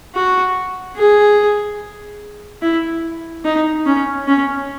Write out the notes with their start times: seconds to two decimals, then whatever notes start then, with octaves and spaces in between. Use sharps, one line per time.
0.15 F#4
0.96 G#4
2.62 E4
3.45 D#4
3.86 C#4
4.27 C#4